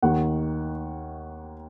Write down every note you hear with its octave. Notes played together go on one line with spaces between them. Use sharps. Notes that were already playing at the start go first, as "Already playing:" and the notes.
D#2 D#3 F#5